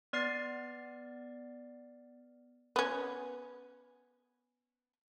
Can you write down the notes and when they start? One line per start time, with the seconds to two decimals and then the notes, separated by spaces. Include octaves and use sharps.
0.13 B3 D5 F6 A6 C7
2.76 B3 C#4